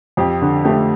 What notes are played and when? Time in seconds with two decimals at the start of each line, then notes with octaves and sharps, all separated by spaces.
0.17 F2 G4
0.42 D3
0.65 A3 G4